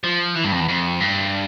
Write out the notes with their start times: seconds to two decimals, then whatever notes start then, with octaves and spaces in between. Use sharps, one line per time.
0.04 F3
0.35 E3
0.44 G2
0.52 F2
0.60 E2
0.68 F2
1.00 G2